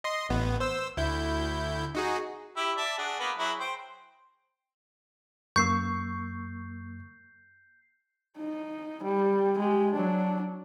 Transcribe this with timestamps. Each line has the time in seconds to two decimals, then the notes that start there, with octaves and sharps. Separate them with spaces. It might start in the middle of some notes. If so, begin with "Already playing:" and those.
0.04 D#5 C6
0.29 A1 B3
0.60 C5 E6
0.97 D2 E4 G6
1.95 D#4 F#4 G#4
2.57 E4 G4 E6
2.77 D5 E5 A5
2.98 D4 F#4 G#4
3.19 A#3 B3 F#5
3.37 F#3 E4 G#4
3.60 C5 G5
5.56 F#2 A#3 C#6 E6 G6 C7
8.38 D#4
9.03 G3
9.58 G#3 G4
9.93 F#3 D4